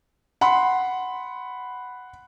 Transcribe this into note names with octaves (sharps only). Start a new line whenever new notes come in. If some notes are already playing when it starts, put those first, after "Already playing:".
F#5 B5 C6